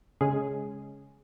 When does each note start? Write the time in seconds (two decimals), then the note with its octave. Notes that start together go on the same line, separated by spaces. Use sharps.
0.21 C#3 G#3 C#4 G#4